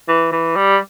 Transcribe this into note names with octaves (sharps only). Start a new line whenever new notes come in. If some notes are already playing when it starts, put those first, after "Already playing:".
E3
E3
G3